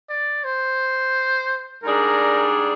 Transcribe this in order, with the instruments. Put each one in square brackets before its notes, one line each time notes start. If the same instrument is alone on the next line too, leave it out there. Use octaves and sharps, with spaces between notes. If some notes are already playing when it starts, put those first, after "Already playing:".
[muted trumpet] D5
C5
[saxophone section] G#2 G3 D4 G#4 [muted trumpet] A#4